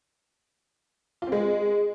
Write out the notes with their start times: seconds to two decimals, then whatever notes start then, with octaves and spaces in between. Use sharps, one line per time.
1.22 F4
1.27 C4
1.32 G#3